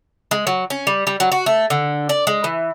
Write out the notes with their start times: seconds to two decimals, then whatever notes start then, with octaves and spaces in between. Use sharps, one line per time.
0.31 G#3
0.47 F#3
0.70 C#4
0.87 G3
1.07 G3
1.20 F#3
1.32 F#4
1.46 A3
1.70 D3
2.09 D5
2.27 G#3
2.44 E3